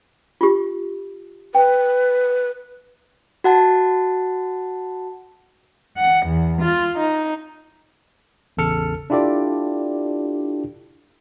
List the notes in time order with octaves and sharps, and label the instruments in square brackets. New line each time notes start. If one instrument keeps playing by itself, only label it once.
[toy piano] F4 G4
[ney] B4 [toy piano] G5
[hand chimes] F#4 F#5 A5
[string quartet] F#5
E2
F4
D#4
[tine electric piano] A1 E2 C#3 A4 F6 C#7
D4 E4 F4 G4 A4 D5